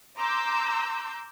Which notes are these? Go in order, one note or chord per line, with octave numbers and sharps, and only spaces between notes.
A#5 C6 D6 E6 G6